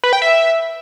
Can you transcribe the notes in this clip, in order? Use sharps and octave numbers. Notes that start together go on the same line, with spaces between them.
B4
G5
E5